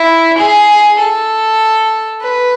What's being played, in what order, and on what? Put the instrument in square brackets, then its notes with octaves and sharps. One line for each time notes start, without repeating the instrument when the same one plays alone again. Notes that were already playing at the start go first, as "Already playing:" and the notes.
Already playing: [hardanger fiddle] E4
G#4
A4
B4